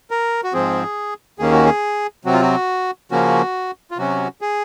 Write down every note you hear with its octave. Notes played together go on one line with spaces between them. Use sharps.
A#4
F#4
G#2 F3 C4 G#4
D#2 D#3 A#3 C#4 G#4
F#4
G#4
C3 F#3 C4 F#4
F4
F#4
C#3 F3 A#3 C#4 F#4
F4
C3 F#3 C#4 F#4
G#4